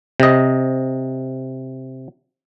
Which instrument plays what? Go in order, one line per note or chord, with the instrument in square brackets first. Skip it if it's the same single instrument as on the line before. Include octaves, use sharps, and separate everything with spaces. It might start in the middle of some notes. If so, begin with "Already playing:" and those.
[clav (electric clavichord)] C3 D#5